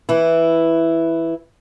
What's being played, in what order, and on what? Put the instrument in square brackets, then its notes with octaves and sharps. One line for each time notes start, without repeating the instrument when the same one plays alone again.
[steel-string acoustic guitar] E3 E4